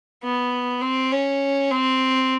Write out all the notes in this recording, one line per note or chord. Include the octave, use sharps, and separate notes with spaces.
B3
C4
C#4
C4